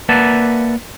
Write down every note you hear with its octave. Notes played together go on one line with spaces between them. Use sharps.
A#3 B4 D5 E5 F#5 A5